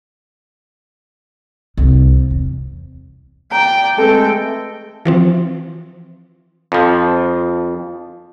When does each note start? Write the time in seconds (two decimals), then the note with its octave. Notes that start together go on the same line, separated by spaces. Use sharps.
1.77 C2 C3
2.31 E2
3.51 D5 G5 A#5
3.98 G#3 A3 C4 A4 B4 G5
5.05 E3 F3 C4
6.72 F2 F3